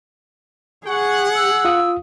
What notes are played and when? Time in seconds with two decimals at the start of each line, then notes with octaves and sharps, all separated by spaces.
0.87 G#4 F#5 C#6
1.35 E6
1.65 F4 F5 D#6